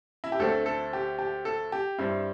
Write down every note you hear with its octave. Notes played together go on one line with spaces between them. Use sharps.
E4
G4
D2 D3 A3 C4 A4
A4
G4
G4
A4
G4
G2 G3 C4 E4